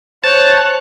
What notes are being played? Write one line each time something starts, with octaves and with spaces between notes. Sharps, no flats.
C5 C#5 A5 F#6